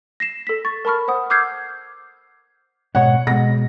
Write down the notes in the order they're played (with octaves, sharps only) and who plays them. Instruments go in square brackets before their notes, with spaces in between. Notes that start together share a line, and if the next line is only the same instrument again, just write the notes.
[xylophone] A#6 C7 E7
A4 B6
C#6 A6
A#4 A5 B5 C#6 F6
C5 F#5 D#6
D6 E6 F6 G6 G#6 C7
[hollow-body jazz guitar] G#2 B2 C#5 [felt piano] F#5
[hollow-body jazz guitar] B2 G#3 [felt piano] A#6